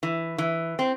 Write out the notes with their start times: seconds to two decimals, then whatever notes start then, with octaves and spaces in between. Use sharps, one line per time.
0.03 E3
0.38 E3
0.79 C4